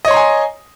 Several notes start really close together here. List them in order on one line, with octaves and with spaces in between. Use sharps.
D#5 C#5 C6 A#5 G#5